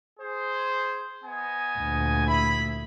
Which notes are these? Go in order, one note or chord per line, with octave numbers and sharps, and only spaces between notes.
G#4 C5
B3 D#5 G#5
D2 A#2
E4 E5 B5